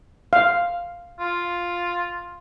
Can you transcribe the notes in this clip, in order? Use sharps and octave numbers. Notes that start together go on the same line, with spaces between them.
F5
F4